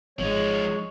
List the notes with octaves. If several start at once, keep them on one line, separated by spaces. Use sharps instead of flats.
G#1 F3 G#3 D#4 C#5